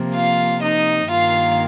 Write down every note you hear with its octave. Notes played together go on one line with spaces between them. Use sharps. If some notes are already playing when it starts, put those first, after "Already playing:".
Already playing: C3 F3 A#3
F4 F5
D#4 D#5
G2 D#3 A#3 F4 F5